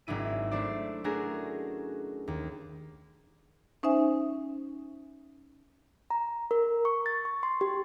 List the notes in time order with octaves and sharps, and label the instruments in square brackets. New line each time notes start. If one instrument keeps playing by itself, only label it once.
[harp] G#1 F#3 D4 E4 D#7
A3 D4 E4 C5 D5
A3 C#4 D4 F#4 G#4 A#4
D#2
[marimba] C#4 D#4 C5 E5 G#5
[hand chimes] A#5
A#4
C#6
A6
C#6
C6
G4